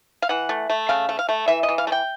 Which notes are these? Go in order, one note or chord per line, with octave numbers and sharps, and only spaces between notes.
F5
E3 F#5
A3
A3
C#3 F5
A3
F5
A3
E3 E5
D#5
E3
F5
A3
G5